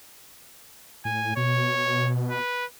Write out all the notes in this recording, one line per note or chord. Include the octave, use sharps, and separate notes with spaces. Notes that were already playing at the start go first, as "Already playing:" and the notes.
A2 G#5
B2 C#5
B4